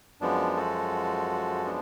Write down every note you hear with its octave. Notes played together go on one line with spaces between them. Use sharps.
F#2 F3 G#3 B3 D4
F#4 A4
B3 D4